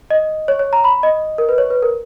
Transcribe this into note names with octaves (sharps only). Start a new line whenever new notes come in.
D#5
C#5
C#5
A#5
B5
D#5
A#4
B4
C#5
B4
A#4